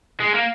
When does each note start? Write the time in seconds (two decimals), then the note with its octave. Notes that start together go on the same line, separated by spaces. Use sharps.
0.20 G#3
0.34 A#3